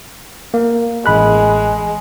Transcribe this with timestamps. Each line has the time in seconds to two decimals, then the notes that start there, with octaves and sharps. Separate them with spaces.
0.54 A#3
1.06 A1 G#3 B5 F#6